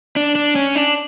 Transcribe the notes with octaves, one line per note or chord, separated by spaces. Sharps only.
D4
D4
C#4
D4